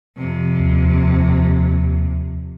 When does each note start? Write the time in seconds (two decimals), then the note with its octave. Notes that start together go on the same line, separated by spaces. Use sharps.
0.17 F2 C3
0.59 D#2